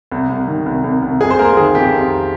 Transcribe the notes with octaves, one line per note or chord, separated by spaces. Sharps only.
C2
C2
D#3
C2
C2
C2
F2 G#4
C5
A#3 A#4
D#3 G#4
F2 G4
F2